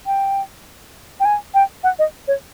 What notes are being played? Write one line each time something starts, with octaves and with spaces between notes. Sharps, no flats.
G5
G5
G#5
G5
F#5
D#5
C#5